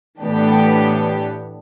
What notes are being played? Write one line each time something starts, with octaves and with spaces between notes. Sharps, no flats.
A2 E3 B3 D4 G4